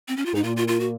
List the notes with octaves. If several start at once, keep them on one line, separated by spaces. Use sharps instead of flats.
C4
C#4
F4
G#2 D#4
A#2 F4
F4
F4
F#4